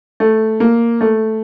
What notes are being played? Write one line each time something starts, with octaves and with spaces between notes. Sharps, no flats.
A3
A#3
A3